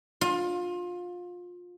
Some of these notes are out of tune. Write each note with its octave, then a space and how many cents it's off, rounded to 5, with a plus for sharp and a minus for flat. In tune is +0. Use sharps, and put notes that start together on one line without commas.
F4 +25